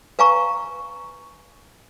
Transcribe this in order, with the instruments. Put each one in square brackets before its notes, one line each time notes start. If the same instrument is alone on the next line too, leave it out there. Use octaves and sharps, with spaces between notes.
[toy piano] B4 F5 G#5 A#5 C#6